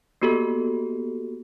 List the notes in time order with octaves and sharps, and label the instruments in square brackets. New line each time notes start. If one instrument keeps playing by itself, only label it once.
[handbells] A#3 B3 F#4 G4 A4